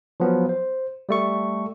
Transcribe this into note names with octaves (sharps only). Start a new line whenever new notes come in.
F3 F#3 B3
C5
G3 A3 C#6